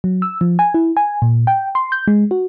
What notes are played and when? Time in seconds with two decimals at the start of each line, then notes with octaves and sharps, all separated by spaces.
0.04 F#3
0.22 E6
0.41 F3
0.59 G#5
0.74 E4
0.97 G#5
1.22 A#2
1.47 G5
1.75 C6
1.92 G6
2.07 G#3
2.31 F#4